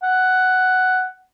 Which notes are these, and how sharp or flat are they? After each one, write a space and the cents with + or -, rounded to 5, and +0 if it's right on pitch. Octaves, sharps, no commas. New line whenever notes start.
F#5 +5